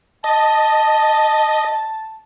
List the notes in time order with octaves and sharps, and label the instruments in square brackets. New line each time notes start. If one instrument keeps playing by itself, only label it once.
[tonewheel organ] D#5 [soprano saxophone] A5